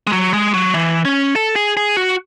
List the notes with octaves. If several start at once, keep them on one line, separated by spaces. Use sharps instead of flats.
G#3
F#3
G#3
F#3
E3
C#4
A4
G#4
G#4
F#4